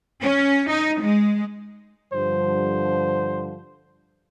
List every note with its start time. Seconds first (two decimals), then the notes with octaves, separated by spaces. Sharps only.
0.22 C#4
0.69 D#4
1.01 G#3
2.13 G2 D3 F3 C5